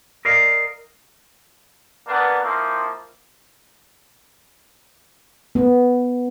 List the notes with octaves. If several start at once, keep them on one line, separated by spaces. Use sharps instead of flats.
A#4 D5 D#5 F5
A#3 B3 D4 B4
F3 A#3 C4 E4
B3